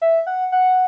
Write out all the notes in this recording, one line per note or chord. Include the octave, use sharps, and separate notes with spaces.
E5
F#5
F#5